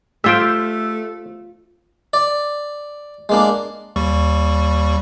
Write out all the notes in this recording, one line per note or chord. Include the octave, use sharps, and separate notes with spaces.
A3 F4 G4 C5 E5 G5 E6
D5
G#3 A#3 D4
D#2 G3 C#6